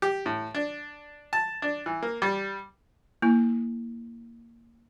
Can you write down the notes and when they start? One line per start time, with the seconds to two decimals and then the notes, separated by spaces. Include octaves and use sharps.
0.02 G4
0.26 A2
0.55 D4
1.33 A5
1.62 D4
1.86 E3
2.03 A#3
2.22 G3
3.22 A#3 E4